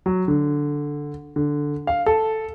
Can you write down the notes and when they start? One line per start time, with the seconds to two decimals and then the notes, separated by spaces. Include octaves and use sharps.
0.06 F#3
0.28 D3
1.36 D3
1.87 F5
2.06 A4